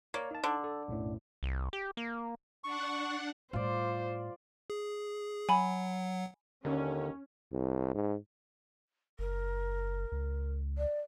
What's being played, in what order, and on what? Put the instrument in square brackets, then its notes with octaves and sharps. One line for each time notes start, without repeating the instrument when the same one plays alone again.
[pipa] A#3 [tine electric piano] C#5 D5
[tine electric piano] D#4 A5
[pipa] D3
[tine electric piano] A4
B1 F#2 A2
[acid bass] C2
G4
A#3
[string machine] D4 F#5 [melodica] C#6
[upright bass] A2 G3 [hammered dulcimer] F4 D5 [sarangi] C5
[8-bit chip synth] G#4
[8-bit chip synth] F#3 F#5 [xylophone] G#5 B5
[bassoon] D#2 [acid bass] D3 [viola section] C#4
[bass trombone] C2
G#2
[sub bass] F#1 [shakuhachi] A#4
[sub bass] C#2
[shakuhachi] D5